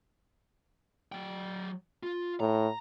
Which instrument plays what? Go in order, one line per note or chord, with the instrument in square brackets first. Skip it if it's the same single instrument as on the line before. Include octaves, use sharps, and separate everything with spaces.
[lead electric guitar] F#3 G5
F4
[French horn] A2 [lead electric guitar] A#5